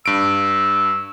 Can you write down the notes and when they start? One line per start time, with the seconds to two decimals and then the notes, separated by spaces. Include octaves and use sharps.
0.06 G2 E6 D7